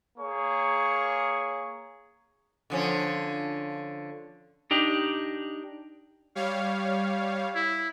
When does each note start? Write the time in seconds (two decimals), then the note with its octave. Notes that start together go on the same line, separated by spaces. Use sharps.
0.18 A#3 G#4 C#5 C#6
2.70 D3 F3 C#4
4.71 D4 D#4 G4
6.35 G3 C#5 F5
7.55 E4